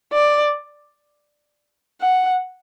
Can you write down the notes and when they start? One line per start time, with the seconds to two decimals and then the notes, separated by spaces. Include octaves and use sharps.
0.13 D5
2.01 F#5